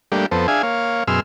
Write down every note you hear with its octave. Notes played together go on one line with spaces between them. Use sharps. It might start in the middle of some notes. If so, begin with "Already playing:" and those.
G3 A3 A#3 D4 G4
F2 B3 A4 C5
D4 G#4 E5 F5 G#5
A#3 C#5 F5
F#2 B2 G#4 C6 E6 F6